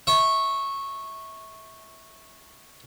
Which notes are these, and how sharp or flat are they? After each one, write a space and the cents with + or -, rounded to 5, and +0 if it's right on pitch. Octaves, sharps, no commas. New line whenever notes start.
E5 -25 C#6 -10